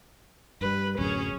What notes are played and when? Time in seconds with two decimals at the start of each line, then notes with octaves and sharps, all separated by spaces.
0.61 G2 G3 B4
0.99 D1 F#2 C#4 G#4